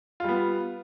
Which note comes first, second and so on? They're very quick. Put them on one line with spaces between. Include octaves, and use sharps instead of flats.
F4 G3 B3